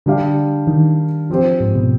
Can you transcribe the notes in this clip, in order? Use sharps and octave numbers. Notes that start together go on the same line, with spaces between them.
D3 G3 D4 G4 D5 F5
D#3
F3 C4 G4 C5
G#2
B2